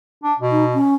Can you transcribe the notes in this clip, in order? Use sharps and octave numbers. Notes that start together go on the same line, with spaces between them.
D4
B2
D#4
C#4